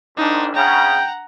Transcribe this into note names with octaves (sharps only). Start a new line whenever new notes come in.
A1 D4 D#4
C#3 F#5 G5 A#5